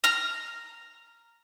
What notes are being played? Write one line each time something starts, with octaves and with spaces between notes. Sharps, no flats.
A#5 F6